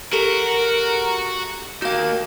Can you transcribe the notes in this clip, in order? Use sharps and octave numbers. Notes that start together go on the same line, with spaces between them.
F#4 G4 A4 A#4
A#3 D#4 F#4 F5